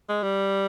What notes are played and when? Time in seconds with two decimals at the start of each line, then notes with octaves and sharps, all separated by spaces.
0.09 G#3
0.23 G3